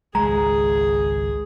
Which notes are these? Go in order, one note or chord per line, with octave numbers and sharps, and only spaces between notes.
G#1 C#2 G#3 G#4 A#5